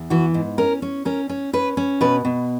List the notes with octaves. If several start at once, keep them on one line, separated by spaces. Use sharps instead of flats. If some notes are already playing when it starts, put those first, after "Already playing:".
Already playing: E2
E3 F#4
G#2
C#4 A#4
C#4
C#4 A#4
C#4
C#4 B4
C#4
B2 B4
B2